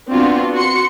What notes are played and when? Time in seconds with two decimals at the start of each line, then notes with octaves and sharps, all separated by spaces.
0.11 B3 C4 D4 F4 F#4
0.53 F#4 C6 C#7